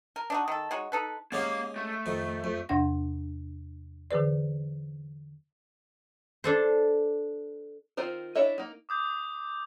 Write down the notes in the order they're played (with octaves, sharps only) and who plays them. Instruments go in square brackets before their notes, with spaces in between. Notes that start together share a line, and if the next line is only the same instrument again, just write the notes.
[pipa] A#4
D4 D#4 F#4
D#3 A4
G#3 D#4 F#4 C#5
D#4 A4 B4
[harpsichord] G#3 C#4 G4 [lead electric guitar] A#3 F5
[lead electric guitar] A3
[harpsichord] F2 D#3
F2
[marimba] E2 C3 D4 F#5 A#6
D3 E3 G#4 B4 D5
[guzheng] D4 A4 C5
[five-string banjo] D#3 C4 F4 A#4 C5
D4 E4 C#5 D#5 E5
A#3 D#4
[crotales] D6 D#6 G6